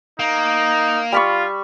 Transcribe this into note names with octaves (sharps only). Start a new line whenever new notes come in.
A#3 D#4
G3 F4 B5 C#6